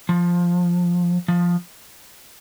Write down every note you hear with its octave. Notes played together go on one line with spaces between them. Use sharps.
F3
F3